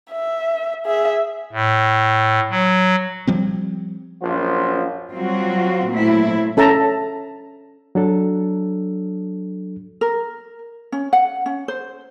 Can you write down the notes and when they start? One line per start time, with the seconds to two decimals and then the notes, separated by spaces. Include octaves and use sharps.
0.12 E5
0.86 G#4 E5
1.52 A2
2.51 F#3
3.27 F3 G3 C4
4.22 A#1 F#2 F3 F4 C5
5.13 F#3 G3 C4 F4 F#4
5.88 A#2 F#3 A3 C4 E4
6.57 C#4 A4 E5 A5 A#5
7.95 F#3 D4 A4
10.01 A#4
10.92 C#4
11.13 F#5
11.46 C#4
11.68 C5